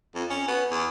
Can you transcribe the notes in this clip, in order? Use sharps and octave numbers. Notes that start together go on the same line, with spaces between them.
F2
C#4
B3
E2